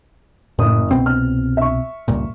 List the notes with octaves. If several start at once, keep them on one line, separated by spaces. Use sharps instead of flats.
F#1 A2 D#6
C2 B2 C4 G5
F6
E5 C#6
C#2 G2 A#2